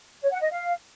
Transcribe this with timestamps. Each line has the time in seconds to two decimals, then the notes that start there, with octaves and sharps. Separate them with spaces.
0.22 C#5
0.32 F#5
0.41 D#5
0.51 F5